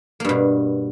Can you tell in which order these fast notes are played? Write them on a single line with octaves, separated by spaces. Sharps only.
A#3 G2 B2